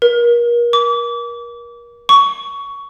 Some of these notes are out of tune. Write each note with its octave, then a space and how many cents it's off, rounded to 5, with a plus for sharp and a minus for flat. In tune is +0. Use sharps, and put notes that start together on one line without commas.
A#4 +35
D6 -30
C#6 +15